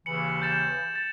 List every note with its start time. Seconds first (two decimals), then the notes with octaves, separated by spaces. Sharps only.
0.06 D#2 C#3 E3 C#7 F#7
0.42 G6 A6 E7
0.96 A6